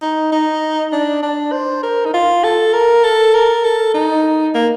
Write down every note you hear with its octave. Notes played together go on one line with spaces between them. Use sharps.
D#4
D#4
D4
D4
C5
A#4
D#4
F4
A4
A#4
A4
A#4
A4
D#4
A#3